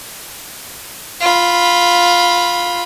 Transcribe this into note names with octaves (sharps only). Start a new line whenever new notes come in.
F4 B5